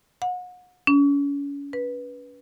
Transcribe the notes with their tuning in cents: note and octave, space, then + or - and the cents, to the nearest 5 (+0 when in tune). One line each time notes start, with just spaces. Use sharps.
F#5 -35
C#4 +35
B4 -15